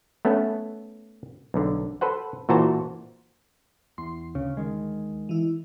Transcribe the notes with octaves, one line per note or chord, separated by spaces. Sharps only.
A3 B3 C#4 A4
B1 D3
A4 B4 C5 F#5
A#2 E3 F#4 C5 A5 A#5
E2 C6
D2 C#3
D#3 G#3
E3 E4